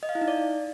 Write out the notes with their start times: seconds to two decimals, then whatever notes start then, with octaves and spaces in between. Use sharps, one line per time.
0.03 D#5
0.09 F5
0.15 E4
0.21 D#4
0.28 D5